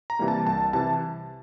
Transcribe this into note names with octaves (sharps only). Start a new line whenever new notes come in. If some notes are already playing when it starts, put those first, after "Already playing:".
A#5
C3 E3 G3 A#3
A5
C2 A5
C3 E3 A5